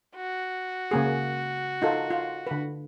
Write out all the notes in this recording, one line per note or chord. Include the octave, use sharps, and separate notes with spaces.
F#4
C#3 A#3 G#4
D#4 F4 A4
F4
D3 B4